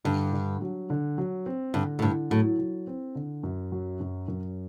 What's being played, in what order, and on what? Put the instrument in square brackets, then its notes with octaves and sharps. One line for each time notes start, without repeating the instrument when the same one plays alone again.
[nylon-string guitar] G2 [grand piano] D3
[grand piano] D3
F#3
D3
F#3
C4
[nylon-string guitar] G2 [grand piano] D3
[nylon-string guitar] A2
[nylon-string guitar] G2 [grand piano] D3
[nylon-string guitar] A2 [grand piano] F#3
[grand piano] F#3
C4
D3
F#2
F#3
F#2
F#2